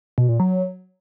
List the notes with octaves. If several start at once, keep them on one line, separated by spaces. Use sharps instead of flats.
B2
A#2
F#3